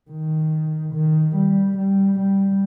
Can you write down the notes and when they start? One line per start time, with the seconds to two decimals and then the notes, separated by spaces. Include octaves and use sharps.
0.11 D#3
0.94 D#3
1.35 G3
1.78 G3
2.19 G3